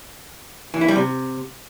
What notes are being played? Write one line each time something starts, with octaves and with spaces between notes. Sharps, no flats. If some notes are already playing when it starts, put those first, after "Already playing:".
E3
E4
G3
C3